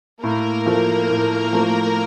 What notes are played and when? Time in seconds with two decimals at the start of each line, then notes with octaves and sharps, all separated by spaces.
0.22 A2 A#3 A#4
0.66 F3 A3
1.10 A2
1.53 F3 A3